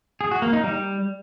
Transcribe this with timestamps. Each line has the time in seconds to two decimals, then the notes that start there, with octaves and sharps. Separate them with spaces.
0.21 G#4
0.31 F#4
0.42 A#3
0.53 D#4
0.64 G3